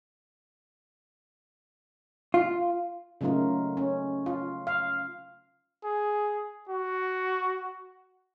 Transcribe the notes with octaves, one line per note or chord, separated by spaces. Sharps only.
F4
C#3 F#3 A3 A#3 D#4 F4
C#4
F4
F5
G#4
F#4